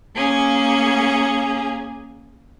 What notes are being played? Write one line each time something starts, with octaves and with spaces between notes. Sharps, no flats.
A#3 C#4 G#4